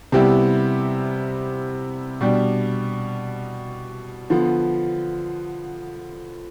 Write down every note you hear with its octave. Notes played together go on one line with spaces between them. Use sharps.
C3 G3 B3 E4 G4
B2 G3 D4 G4
D3 F3 B3